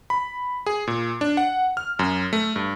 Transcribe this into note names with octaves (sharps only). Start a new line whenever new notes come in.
B5
G#4
A#2
D4
F#5
F6
F#2
A3
G2